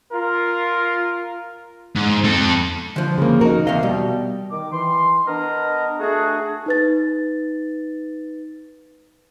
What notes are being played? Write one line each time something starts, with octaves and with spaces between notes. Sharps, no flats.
F4 A#4
G#2
C4 A4
D3 F3
C#3 A#3
D#4 F#4 A#4
E2 C3 D#5 F5
B2 G3
D#3 D6
E3 C6
B3 D4 A#4 D#5
A3 D4 F#4 G#4
D#4 B4 A6